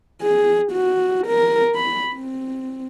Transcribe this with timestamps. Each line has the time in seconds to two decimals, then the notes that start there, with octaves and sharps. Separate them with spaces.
0.22 G#4
0.72 F#4
1.27 A#4
1.75 B5
2.15 C4